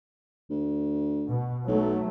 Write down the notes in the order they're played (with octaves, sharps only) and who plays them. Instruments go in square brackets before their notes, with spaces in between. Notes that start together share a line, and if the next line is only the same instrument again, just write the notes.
[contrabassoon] D2
[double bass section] B2
[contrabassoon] B1 [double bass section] F#3 A3